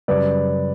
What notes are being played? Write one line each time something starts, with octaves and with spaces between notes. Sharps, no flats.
F#2 C#3 G3 B4 D5